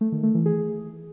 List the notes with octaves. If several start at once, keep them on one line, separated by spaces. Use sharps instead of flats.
A3
D#3
A3
E3
G#4